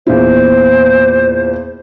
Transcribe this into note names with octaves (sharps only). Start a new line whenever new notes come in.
E2 A#2 E4 C5